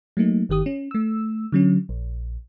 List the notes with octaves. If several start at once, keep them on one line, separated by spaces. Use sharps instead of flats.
F#3 A3 A#3 D#4
G1 D#3 G4 D#6
C#4
A3 E6
D3 F#3 C#4
A#1